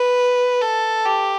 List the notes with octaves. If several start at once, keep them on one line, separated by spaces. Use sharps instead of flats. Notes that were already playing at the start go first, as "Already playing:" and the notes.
Already playing: B4
A4
G4